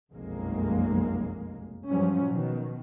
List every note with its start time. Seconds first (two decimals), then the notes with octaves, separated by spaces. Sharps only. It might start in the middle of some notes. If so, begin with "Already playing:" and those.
0.12 F1 B1 F#2 G#3 A#3
1.89 G2 F3 F#3 C#4
2.27 B2 D#3